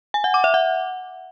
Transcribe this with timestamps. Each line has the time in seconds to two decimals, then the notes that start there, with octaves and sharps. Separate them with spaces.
0.14 G#5
0.24 F#5
0.34 D6
0.44 E5
0.54 F#5